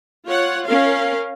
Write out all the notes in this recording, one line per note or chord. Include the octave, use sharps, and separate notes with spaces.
F4 C#5 F#5
C#4 A#4 F5